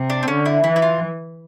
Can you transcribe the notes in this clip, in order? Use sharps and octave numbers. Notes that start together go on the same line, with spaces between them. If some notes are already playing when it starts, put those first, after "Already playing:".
Already playing: C3
D4
C4
D3 C#4
E4
E3 E4
E4
F4